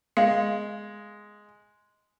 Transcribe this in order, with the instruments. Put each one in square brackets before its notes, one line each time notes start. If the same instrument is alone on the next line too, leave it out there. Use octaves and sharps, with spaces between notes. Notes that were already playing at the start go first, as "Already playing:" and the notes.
[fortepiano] G#3 [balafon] F5